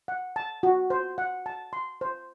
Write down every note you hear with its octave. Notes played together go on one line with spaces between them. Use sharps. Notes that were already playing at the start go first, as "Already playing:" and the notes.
F#5
A5
F#4
C5
F#5
A5
C6
C5